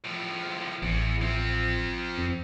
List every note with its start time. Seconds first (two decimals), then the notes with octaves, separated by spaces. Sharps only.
0.04 A2 F3
0.82 A1 E2
1.21 F3 C4
2.18 F2